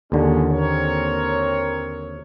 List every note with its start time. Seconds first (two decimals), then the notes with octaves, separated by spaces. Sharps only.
0.12 D#2 A#2 D3 G#3 C#4
0.49 C4 A#4 C#5